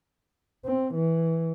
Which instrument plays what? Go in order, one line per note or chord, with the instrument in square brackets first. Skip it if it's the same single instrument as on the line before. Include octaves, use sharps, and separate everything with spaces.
[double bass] C4
E3